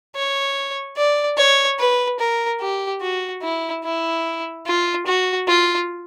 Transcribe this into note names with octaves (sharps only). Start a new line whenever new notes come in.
C#5
D5
C#5
B4
A#4
G4
F#4
E4
E4
F4
F#4
F4